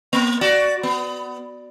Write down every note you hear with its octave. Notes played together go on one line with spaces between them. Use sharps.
A#3
F#4 D5
B3